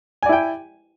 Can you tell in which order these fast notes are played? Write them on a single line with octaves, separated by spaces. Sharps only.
G#5 D5 E4 G5